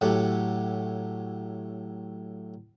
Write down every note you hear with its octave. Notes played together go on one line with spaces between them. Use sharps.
A2 F#3 G4 A4 F#5